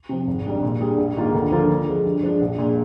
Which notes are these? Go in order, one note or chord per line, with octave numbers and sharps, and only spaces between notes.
C3 F3
G#1
G#2 G3 D4 G#4
A#2
G3 D4 G#4
A#1
G#2 D#3 A#3 F4
D2
D3 F3 A#3 F4
D3
F3 G#3
G2
F3 G#3 D4 F4
A#1
A#2 G#3